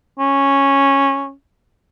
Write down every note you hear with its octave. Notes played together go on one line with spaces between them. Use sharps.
C#4